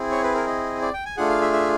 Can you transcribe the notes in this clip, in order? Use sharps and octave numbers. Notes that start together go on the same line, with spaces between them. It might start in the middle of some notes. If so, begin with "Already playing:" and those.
Already playing: C4 E4 G#4
C#5
B4
A#4
D#5
D5
G5
G#5
A3 D4 F4 G#4 F#5
F5
E5
E5